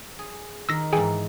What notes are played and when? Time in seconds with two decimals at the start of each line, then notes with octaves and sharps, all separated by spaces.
0.19 G#4
0.69 D#3 E6 A#6
0.93 G#2 E3 G#4 G5 G#5